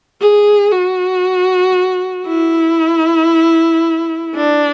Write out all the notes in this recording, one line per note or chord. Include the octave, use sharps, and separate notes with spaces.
G#4
F#4
E4
D4